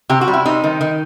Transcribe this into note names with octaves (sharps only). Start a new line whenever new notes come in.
C3 G4
F#4
G3
E4
C3 D#4
D#3
D#3